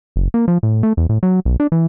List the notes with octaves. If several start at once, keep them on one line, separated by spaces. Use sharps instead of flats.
F#1
A#3
F3
A2
A3
E2
A2
F#3
B1
D4
E3